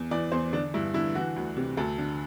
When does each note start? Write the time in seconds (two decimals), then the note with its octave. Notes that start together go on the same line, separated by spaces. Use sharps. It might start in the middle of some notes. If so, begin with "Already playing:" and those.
Already playing: E2
0.11 E3 D5
0.32 E2 C5
0.53 D3 D4
0.74 G2 E4
0.94 D3 E4
1.15 E3 F#4
1.36 D2
1.57 C3
1.77 D2 A4
1.98 D3